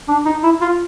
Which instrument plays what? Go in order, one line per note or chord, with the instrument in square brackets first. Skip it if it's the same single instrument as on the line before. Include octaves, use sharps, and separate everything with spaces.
[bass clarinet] D4
D#4
E4
F4